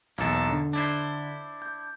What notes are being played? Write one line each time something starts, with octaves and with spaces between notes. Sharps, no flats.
B1 E2 A#3 A4
D3
D4 E4 C5
G6